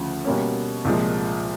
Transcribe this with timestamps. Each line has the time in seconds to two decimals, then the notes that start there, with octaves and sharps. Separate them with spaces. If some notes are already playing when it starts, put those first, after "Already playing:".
Already playing: D2 C#3 F3
0.25 B2 G3 A#3 C#4
0.85 C2 A#2 F3 G#3